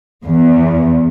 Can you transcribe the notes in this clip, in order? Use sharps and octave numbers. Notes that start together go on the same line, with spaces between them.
E2